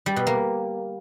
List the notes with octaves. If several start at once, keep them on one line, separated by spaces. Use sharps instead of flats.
G3
B2
A#3